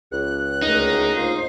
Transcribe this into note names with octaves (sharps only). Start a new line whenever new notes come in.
C#2 F#6
D2 D#4 A#4
C#2 A#3 F4 C5